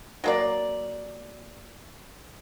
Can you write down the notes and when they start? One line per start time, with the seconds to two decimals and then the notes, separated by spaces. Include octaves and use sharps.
0.24 F#3 A#3 D5